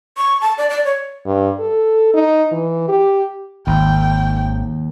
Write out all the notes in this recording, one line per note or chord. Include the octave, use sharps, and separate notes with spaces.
C#6
A5
D5
D5
C#5
G2
A4
D#4
E3
G4
G#1 D#2 G5